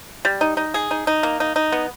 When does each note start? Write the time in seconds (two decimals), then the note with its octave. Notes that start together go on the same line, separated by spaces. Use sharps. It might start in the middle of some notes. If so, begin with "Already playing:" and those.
0.25 G3
0.41 D#4
0.57 D#4
0.74 G#4
0.91 D#4
1.07 D#4
1.23 A#3
1.40 D#4
1.56 D#4
1.72 B3